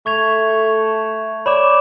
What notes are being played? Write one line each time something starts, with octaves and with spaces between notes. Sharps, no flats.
A3 C#6 G#6 F7
C#5 D5 B5 D6 E7